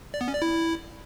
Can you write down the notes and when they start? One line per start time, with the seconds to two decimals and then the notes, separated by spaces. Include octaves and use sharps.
0.14 D5
0.21 B3
0.28 C#4
0.35 D5
0.42 E4